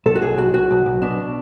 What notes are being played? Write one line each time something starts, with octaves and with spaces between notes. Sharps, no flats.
B1 A4
F#4
B1 G#4
B1 F#4
B1 F#4
B1
B1
B2 D4